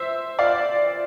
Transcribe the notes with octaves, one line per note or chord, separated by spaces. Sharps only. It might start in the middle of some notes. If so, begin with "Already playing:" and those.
Already playing: C5 E5
D5 F5